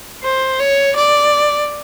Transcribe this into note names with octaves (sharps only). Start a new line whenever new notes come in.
C5
C#5
D5